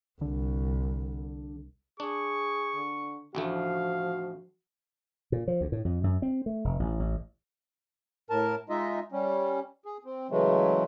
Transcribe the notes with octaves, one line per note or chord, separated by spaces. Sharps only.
C2 D3
D4 G#4 C#6
D3
A1 D2 F3 A3 F#4 F5
A#2
F3
D2
A2
F2
F#2
C4
A3
F1
A1
A1
A2 A#4 A5
G#3 D#4 F4 D#5 E5
G3 C#4
G#4
C4
C#3 E3 F#3 G#3 A3